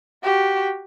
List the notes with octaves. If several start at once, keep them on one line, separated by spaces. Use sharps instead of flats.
F#4 G4